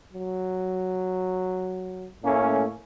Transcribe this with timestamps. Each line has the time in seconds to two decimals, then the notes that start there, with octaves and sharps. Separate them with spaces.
0.13 F#3
2.23 A2 A3 A#3 C#4